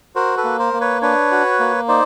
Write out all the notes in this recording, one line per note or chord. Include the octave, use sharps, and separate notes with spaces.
F#4 A#4 C5
A4 B4
A#3
A#4 C5
A#3
B4 C#5
D4 B4 C#5
F#4
A#3
D#4 C5 D5